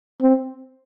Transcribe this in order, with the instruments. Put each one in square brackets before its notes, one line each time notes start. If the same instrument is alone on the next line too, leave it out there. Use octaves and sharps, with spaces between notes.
[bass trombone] C4